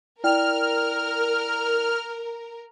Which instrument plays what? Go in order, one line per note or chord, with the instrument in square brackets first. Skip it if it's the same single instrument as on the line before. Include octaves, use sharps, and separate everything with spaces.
[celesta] E4 D5 G5 [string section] A#4 [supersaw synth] F6